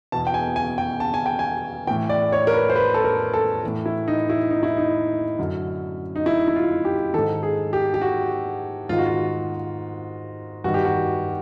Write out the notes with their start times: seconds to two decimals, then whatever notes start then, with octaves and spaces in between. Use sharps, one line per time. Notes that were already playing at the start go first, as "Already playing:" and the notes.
0.12 E2 B2 A5
0.27 G5
0.34 G#5
0.56 G#5
0.78 G5
1.00 A5
1.14 G#5
1.26 G5
1.39 G#5
1.87 A2 E3 G5
2.09 D5
2.32 C#5
2.47 A#4
2.54 B4
2.70 C5
2.76 B4
2.94 A4
3.04 A#4
3.33 A4
3.63 A2 E3
3.86 E4
4.08 D#4
4.30 E4
4.51 D#4
4.63 E4
4.77 D#4
5.39 F#2 D3
6.16 D#4
6.26 E4
6.48 E4
6.56 F4
6.85 G4
7.14 D#3 A4
7.18 G#2
7.43 G#4
7.73 G4
7.94 G4
8.01 F#4
8.89 G#2 D#3 F4
8.98 F#4
9.06 F4
10.64 G2 D#3 F#4
10.74 G4
10.85 F#4